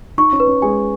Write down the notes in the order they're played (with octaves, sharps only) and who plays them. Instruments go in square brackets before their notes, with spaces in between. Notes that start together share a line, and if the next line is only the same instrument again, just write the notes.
[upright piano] D#4 [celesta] C#6
[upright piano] C#4
[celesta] B4
[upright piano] C#4
[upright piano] G#3 [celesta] G#5